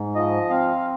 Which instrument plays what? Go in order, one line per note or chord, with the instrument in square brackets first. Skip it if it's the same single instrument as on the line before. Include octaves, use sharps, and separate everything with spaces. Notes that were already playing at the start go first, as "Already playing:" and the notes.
Already playing: [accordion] G#2
F3 D#5
C4 F5